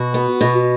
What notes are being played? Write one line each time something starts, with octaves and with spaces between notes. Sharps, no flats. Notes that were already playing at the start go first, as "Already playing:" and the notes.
Already playing: B2 F#4
B3
B2